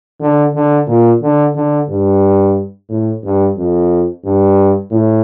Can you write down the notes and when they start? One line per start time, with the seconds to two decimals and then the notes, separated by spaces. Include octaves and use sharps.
0.20 D3
0.54 D3
0.87 A#2
1.22 D3
1.55 D3
1.88 G2
2.89 A2
3.23 G2
3.57 F2
4.24 G2
4.91 A2